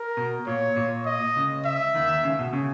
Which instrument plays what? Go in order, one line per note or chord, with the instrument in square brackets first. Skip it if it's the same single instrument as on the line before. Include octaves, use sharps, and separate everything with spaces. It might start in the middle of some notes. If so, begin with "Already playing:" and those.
Already playing: [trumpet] A#4
[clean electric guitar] B2
[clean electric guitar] A#2 [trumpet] C#5
[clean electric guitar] A#2
[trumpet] D#5
[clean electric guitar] C#2 C#3
[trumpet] E5
[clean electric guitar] D#2 D#3
C#2 C#3
B2
C#3